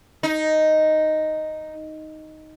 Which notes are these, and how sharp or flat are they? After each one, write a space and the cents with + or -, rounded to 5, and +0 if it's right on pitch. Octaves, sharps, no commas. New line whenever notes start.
D#4 +0